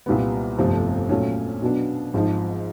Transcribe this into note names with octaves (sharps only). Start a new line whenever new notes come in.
C2 A#2 G3 B3
G1 F2 C3 F3 A3
A#2 F#3 A3 C#4
B2 F#3 B3 D4
G#1 G#2 F3